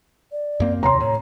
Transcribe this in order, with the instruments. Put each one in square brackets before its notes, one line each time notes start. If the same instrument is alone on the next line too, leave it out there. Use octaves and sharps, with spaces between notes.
[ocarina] D5
[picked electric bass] F#2 A#3 C4
[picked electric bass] D#2 C3 [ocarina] C#5 [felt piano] A#5 C6
[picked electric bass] A2 [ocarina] C#5